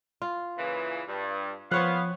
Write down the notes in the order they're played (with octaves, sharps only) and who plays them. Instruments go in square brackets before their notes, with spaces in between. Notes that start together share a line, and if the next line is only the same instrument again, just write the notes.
[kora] F4
[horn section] A#2 C#3 E3
G2
[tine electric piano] F3 F#6 [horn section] B3 F5 [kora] C4 C#5 F#5